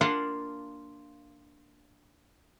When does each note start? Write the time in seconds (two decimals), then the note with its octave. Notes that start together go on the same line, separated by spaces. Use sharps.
0.01 A#3 D4 F4 F#5 A5